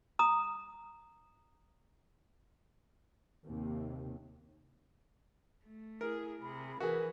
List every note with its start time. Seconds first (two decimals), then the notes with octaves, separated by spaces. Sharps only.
0.19 A#5 D#6
3.46 D#2 C3
5.66 A3
6.01 E4 G#4 A#4
6.42 C3 G#4 B5
6.80 E3 F#4 G#4 A#4 B4